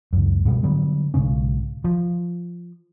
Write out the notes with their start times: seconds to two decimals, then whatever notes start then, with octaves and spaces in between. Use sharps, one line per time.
0.13 C#2 F#2
0.45 G#2 B2 G3
0.63 D3 F#3 G3 B3
1.14 B1 G#2 C#3 C#4
1.84 F3